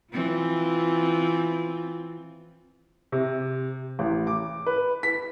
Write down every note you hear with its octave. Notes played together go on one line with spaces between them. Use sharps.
E3 C4 F4
C3
A1
D6
B4
B6